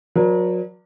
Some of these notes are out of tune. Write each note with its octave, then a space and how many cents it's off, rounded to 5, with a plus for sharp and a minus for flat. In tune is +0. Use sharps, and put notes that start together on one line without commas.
F#3 -30 A#4 +45 D5 +0